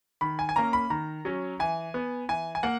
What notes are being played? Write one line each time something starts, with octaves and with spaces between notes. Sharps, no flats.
D#3 B5
G#5
G#5
A#3 C#4 A#5
B5
D#3 A#5
F#3 C#4
E3 G#5
B3
E3 G#5
G#5
A#3 F#5